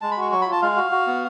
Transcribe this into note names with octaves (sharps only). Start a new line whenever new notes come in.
G#3 A5
B5
F#4 C#6
F#3 C#6
B5
F4
A5
G#3 F5
F#4
F#4
B3